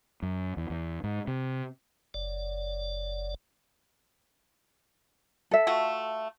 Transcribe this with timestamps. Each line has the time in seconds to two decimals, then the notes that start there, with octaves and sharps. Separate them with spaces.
0.22 F#2
0.57 E2
0.70 E2
1.04 G#2
1.27 C3
2.14 F#1 D5
5.51 A4 E5
5.67 A3 F4 F#4